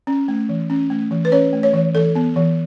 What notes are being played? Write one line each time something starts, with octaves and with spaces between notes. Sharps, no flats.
C#4
A3
E3
C#4
A3
E3
B4
C#4 C#5
A3
C#5
E3
E3 A4
B3
E3